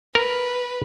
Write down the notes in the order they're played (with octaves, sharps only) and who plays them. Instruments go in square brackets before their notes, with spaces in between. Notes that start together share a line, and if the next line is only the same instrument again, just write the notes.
[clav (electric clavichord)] A#4 A#5 [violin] B4